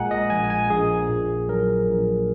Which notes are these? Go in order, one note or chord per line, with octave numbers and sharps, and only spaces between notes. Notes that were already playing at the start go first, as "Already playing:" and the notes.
Already playing: A#1 A#2 G#3 F#5 G#5 A#5
D#5
A#1 G#5
G#5
A#1 G#4
A#2
F#3 A#4
A#1